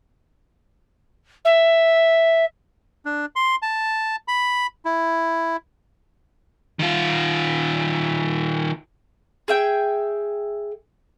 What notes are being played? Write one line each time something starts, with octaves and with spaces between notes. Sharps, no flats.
E5
D4
C6
A5
B5
E4
D#3 F4
G#4 E5 G5